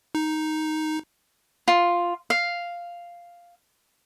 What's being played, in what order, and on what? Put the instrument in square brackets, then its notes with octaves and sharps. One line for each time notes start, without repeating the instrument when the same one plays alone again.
[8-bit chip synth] D#4
[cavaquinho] F4
F5